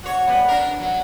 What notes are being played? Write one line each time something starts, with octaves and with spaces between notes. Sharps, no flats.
F#4 C#5
G3 B3
D4 A#4
F#3